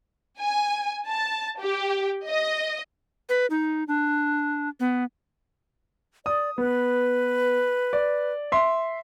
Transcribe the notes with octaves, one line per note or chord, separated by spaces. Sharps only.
G#5
A5
G4
D#5
B4
D#4
D4
B3
D5 D#6
B3 B4
D5
E5 C6